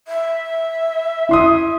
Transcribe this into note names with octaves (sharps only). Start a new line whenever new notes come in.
E5
E4 C6 D#6